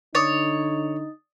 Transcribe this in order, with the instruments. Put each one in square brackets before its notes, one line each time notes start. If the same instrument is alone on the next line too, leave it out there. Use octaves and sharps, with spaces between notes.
[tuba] D3 [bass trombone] D#4 [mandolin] C#5 [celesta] D#6 A6